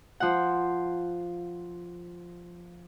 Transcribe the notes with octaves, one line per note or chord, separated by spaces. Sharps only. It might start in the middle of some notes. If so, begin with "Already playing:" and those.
F3 F#5